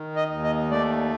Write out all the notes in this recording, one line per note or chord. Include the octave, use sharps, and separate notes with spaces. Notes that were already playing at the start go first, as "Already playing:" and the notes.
Already playing: D#3
D#5
D#2
D#5
A3 D5